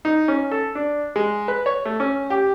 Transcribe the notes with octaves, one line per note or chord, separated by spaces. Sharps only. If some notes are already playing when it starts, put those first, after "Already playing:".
D#4
C#4
A4
D4
G#3
B4
C#5
A3
C#4
G4